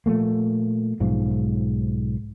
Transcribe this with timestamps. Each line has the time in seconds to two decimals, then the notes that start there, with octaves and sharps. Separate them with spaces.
0.06 A#2 F3 A3 A#3
1.00 B1 G#2 F3